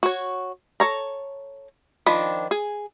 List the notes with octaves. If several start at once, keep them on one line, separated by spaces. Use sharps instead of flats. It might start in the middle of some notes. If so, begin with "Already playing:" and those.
F#4 C#5
A4 C#5 A#5
D#3 F3 D4 B5
G#4